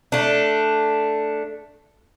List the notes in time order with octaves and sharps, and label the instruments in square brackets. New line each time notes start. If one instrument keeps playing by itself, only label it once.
[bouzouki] A3 D4